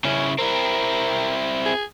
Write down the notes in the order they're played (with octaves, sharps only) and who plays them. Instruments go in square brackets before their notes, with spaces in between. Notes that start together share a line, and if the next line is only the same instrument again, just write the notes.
[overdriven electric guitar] C#3 E4 [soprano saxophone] C#4
[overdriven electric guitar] C4 E4 [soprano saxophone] A#4
[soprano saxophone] G#4